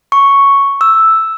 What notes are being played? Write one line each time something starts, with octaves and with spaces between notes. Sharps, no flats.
C#6
E6